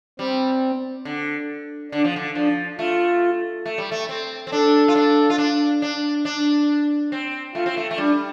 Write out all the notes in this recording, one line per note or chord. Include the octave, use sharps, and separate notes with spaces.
G3 C4
D3
D3 D4
F3
D3
F3 D4
A3 F4
A3
G3
A3
C4
C4
D4 A4
F4
D4
F4
D4
D4
D4
C4
A3 F4
C4
A3
A3
G3 D4